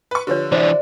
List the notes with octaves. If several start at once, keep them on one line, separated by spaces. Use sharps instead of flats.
B4 C#6
D3 F3 G4 B4 C#5
E3 D4 C5 D5 E5